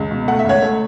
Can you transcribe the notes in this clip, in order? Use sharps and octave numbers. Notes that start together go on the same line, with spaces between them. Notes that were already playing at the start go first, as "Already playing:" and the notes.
Already playing: C#2
B2
A3 F#5
E5
C#2 C#5 F#5
A3